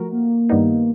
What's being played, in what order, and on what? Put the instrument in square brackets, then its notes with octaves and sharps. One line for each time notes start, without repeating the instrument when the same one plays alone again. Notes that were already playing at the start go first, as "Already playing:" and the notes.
Already playing: [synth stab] F3 A3 F#4 A#4
[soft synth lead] A#3
[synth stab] G2 D#3 G3 B3 D#4